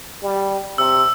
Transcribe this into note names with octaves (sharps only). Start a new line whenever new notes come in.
G3
C3 E6